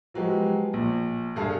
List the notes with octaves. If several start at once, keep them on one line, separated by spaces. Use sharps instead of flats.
F3 F#3 G#3 B3 G4
A#1
E1 G2 G#4 A4 F5 A5